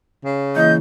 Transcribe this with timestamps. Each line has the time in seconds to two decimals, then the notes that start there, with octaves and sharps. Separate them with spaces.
0.25 C#3
0.56 E3 A#3 E4 D#5 G6